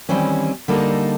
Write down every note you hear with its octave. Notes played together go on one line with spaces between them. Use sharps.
D#3 E3 G3 C4 C#4
D3 G3 A#3 D#4 A4